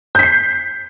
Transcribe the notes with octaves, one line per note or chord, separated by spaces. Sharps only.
G6 B6 C7